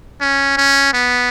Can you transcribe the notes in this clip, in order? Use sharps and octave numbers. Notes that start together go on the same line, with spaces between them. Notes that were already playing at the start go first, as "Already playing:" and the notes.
C#4
C#4
B3